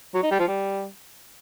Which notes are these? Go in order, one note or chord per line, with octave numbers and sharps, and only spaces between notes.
F#3
D#4
G3
F3
G3